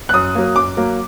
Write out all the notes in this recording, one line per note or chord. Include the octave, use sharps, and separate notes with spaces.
F#6
F#2 D#6
F#3 A#3
F#2 D6
F#3 A#3